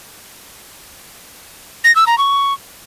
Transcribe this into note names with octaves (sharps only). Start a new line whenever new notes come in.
A#6
E6
A#5
C#6